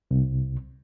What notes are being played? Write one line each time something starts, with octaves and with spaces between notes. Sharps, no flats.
C2